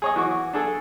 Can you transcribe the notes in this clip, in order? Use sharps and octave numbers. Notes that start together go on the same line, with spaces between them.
G#4 C#5 D#5
E3 F#4 C#6 D6
D4 G#4 A4